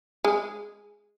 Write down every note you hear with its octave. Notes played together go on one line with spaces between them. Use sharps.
G#3